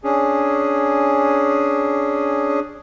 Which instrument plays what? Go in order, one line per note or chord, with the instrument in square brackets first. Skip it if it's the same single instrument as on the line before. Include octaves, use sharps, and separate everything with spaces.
[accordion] C#4 D4 G#4